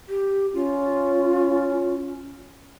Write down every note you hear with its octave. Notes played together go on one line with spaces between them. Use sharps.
G4
C#4 F4